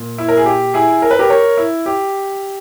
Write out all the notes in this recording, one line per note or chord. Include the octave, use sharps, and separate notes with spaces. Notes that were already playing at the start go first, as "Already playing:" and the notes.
Already playing: A#2
E4
A#4
G#4
G4
E4 G#4
A#4
B4
G4 A#4
A#4 C#5
E4
G4